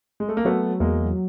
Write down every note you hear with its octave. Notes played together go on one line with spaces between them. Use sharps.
G#3
A3
A#3
F#3 A3 B3
E2 G#3 A#3